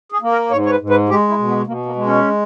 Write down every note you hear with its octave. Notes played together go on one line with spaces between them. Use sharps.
G#4
A#3
A#4
G#2 C#5
C#5
B4
G#2
B4
G#3 G4
E4
B2
B3
B2 A#3
A#3
G#3
C#4